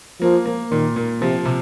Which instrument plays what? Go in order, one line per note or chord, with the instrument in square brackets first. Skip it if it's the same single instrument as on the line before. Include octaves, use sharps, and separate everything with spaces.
[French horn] F3 [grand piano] A#3
[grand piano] A#3
[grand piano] A#2 [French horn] D#3
[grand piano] A#2
[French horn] C3 [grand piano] F3
[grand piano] C3